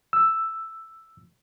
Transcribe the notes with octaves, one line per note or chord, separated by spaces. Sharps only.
E6